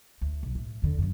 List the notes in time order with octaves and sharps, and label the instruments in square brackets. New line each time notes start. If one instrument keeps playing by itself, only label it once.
[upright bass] D2
B1
A2
E2 D3
F#2 C#3